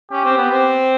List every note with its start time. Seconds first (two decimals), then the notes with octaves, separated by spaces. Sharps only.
0.12 C#4 G4
0.25 C4
0.38 B3
0.51 C4